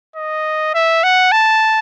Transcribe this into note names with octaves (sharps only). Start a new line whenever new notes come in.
D#5
E5
F#5
A5